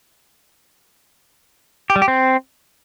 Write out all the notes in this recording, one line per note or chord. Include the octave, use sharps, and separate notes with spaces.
G4
G3
G4
C4